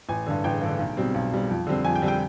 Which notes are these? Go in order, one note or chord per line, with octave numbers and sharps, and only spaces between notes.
A1 G#5
G2 D3
A1 G5
G2 D3
B1
B2 G3 C4
B1
B2 G3 C4
F2
D3 G3 C4
F2 G#5
G5
D3 G3 C4
G5